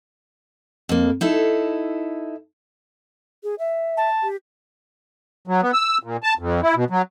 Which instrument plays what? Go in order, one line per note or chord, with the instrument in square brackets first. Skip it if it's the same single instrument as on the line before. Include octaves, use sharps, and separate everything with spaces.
[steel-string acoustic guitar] F2 A#3
D#4 E4 A4
[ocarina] G#4
E5
[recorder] A5
[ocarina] G4
[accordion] F#3
B3
E6
A#2
A5
F2
E4
B2
F#3